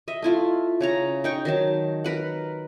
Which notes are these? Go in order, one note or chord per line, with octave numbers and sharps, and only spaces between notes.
D#5 E5
A3 E4 F4
C#3 C#5 A#5
D#4 G5 C#6
D#3 F#3 A5
A#4 B4 F#5